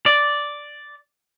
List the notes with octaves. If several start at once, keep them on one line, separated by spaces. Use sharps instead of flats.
D5